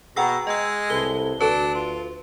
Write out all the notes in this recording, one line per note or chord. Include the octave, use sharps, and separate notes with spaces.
B2 G#4 F#5 G5 A#5 E6 A#6
G#3 D#5 E6
C2 A4 B4 G7
D2 D4 F#4 A4 B4
F4